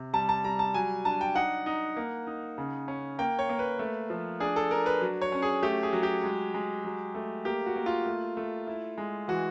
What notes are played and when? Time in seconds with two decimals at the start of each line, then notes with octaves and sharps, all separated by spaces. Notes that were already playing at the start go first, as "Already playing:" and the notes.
Already playing: C3
0.13 G3 A5
0.29 A5
0.44 G3 A#5
0.59 A5
0.74 F#3 G#5
1.05 D4 A5
1.21 G5
1.35 D#4 F#5
1.66 D#4
1.96 A#3
2.27 D#4
2.58 C#3
2.88 C#4
3.19 A#3 G5
3.39 C#5
3.49 A#3
3.59 B4
3.79 A3
4.10 F3
4.40 D4 G#4
4.56 A4
4.71 D4 A#4
4.86 B4
5.01 F#3
5.22 C#5
5.32 C#4
5.42 G#4
5.62 A3 G4
5.83 G#4
5.93 F#3
6.03 G4
6.23 G#3
6.54 G#3
6.84 F#3
7.15 A3
7.45 A#3 G4
7.66 F#4
7.76 A#3
7.86 F4
8.06 A3
8.37 A3
8.67 E4
8.98 G#3
9.28 E3 F#4